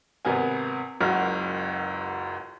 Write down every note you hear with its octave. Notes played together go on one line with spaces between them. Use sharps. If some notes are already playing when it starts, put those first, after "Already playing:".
G#1 C3 B3 A#4 G#5
F#1 C#2 F#2 F#4 F6